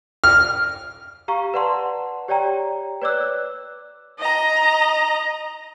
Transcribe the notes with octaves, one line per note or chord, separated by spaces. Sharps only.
F6
G4 F5 A#5 C#6
B4 D5 F#5 A5 C6
G4 C#5 D5 G5 A#5
B4 C#5 D5 D6 E6 F#6
D#5 A#5